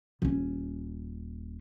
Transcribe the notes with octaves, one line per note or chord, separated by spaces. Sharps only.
D#1 C#4